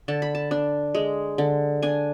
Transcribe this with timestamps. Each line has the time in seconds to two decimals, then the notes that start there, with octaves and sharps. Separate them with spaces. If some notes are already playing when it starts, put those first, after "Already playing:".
0.08 D3 A5
0.22 B5
0.35 A5
0.51 D4
0.95 G#3
1.38 D3
1.82 D4 G#5